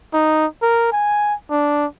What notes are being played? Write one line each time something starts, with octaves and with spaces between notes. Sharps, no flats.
D#4
A#4
G#5
D4